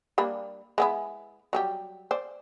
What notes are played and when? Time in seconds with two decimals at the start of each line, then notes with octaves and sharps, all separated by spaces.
0.18 G3 A#3 D4
0.78 G#3 B3 E4
1.53 F#3 G3 G4
2.11 C5 D5